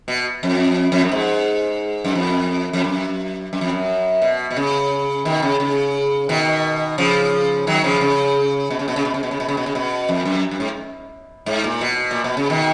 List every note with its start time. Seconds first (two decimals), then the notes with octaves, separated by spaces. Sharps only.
0.08 B2
0.43 F2
0.92 F2
1.02 F#2
1.12 G#2
2.05 F#2
2.15 F2
2.73 F2
2.84 F#2
3.53 F#2
3.61 F2
3.70 F#2
4.22 B2
4.51 B2
4.56 C#3
5.25 B2 D#3
5.42 C#3
5.60 C#3
6.29 B2 D#3
6.98 C#3 F3
7.67 D#3 F#3
7.84 C#3 F3
8.01 C#3
8.70 B2
8.79 C#3
8.88 B2
8.96 C#3
9.05 B2
9.14 C#3
9.23 B2
9.31 C#3
9.40 B2
9.48 C#3
9.57 B2
9.66 C#3
9.75 B2
10.09 F2
10.25 F#2
10.51 F#2
10.60 G#2
11.46 G#2
11.64 A#2
11.81 B2
12.11 A#2
12.24 B2
12.37 C#3
12.50 B2 D#3